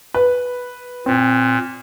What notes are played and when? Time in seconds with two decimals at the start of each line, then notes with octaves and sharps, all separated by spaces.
0.14 B4
1.06 A#2 C4